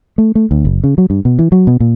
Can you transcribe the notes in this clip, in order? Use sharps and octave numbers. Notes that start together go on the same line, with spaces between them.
A3
A3
D2
F#1
C#3
F#3
G2
B2
E3
F#3
B2
A#2